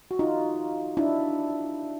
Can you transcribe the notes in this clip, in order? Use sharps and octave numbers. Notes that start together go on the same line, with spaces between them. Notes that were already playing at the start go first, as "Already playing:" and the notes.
F#4
D#4 F4
D4 E4